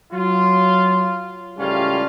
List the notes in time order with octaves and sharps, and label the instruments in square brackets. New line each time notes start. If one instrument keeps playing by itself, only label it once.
[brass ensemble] F#3 F4
C#2 A2 G3 C#4 F4 F5